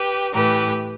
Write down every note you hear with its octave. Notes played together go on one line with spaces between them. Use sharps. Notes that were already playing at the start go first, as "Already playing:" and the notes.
Already playing: G4 B4
A2 E3 G4 B4